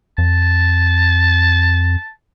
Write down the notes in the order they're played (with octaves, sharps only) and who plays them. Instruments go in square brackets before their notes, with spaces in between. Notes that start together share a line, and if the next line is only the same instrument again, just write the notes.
[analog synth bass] F2 [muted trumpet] A5